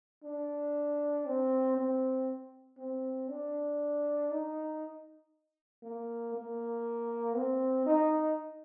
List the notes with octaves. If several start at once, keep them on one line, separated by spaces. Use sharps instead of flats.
D4
C4
C4
C4
D4
D#4
A#3
A#3
C4
D#4